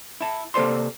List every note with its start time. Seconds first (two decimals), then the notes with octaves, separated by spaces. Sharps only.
0.21 E4 A5
0.54 C3 A#3 A4 C5 D5 C6